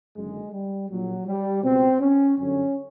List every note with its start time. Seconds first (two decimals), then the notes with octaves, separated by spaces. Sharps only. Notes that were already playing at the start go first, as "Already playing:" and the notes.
0.16 F#1 F#2 D3 G#3
0.52 G3
0.89 A#1 A#2 F#3
1.27 G3
1.63 C#2 B2 C4
2.01 C#4
2.37 G1 F#2 D3 C#4